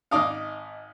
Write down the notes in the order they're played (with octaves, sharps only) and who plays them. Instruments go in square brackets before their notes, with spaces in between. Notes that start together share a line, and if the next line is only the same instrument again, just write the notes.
[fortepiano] G#1 D#4 D5 D#5 F5